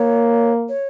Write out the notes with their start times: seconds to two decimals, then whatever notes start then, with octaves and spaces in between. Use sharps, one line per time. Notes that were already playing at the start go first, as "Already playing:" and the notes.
Already playing: A#3 C#5
0.69 C#5